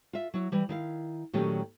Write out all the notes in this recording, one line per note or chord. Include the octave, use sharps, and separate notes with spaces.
F4 E5
F#3 E4
E3 G3
D#3 E4 F5
A#2 D#3 F#3 A3 C#4 G4